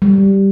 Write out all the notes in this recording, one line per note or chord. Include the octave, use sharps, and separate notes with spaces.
G3